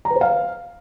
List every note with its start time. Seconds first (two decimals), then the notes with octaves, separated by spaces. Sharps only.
0.05 A#5
0.10 B4
0.16 C5
0.21 F5